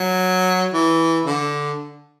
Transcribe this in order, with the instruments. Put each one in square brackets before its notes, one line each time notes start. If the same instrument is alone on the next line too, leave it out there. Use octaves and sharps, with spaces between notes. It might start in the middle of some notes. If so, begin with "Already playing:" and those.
Already playing: [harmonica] F#3
E3
D3